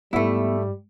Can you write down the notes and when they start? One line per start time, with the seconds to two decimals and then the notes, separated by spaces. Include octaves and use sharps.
0.13 G#2 G3 A3 B3 E4